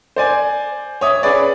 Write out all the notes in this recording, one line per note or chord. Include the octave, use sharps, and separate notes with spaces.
C5 D5 G#5
C#5 E5 D#6
C#4 G#4 B4 D5 G#5